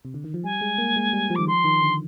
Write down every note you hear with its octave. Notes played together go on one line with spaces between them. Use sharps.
C3
D3
D#3
F3
G3 G#5
G#3
A#3
G#3
G3
F3
D#3 D6
F3 C6
D#3
D3